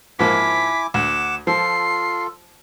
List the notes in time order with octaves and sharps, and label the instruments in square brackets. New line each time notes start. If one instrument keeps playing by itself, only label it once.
[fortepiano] G#2 F3 A#3 [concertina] E4 G#5 D6 [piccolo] B6
[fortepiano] D2 [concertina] F#5 D6 [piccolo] E7
[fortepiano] F3 [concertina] F4 A4 [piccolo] C7